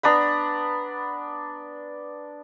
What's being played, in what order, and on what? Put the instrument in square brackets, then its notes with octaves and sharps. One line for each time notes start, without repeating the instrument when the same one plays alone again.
[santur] B3 D4 A#5 B5